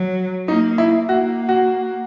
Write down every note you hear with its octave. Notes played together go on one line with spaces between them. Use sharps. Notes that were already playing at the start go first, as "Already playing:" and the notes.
Already playing: F#3
A#3 D#4
E4
A#3 F#4
F#4